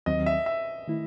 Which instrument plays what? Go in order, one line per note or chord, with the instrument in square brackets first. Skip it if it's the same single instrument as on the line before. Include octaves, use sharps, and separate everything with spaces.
[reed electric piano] D#2 D#3 F#3 C4 [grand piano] D#5
[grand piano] E5
E5
[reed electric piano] D#3 A3 E4